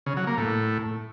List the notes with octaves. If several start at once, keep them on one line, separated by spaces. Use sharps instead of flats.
C#3
F#3
A#3
A2